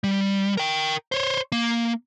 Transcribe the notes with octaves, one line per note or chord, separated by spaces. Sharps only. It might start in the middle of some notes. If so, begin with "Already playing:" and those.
G3
A#4 G5
C5 C#5
A#3